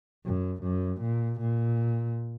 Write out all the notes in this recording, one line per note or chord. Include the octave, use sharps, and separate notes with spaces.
F#2
F#2
A#2
A#2